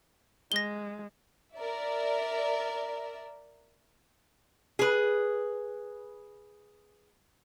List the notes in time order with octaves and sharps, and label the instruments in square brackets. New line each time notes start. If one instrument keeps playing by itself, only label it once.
[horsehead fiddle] G#3 [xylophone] A#6 G7
[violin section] A#4 D5 E5
[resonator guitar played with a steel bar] G#4 B4